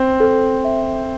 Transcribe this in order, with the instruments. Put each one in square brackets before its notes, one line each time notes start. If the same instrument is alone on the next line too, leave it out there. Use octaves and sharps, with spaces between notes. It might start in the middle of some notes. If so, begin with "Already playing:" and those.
Already playing: [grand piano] C4
[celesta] A4
E5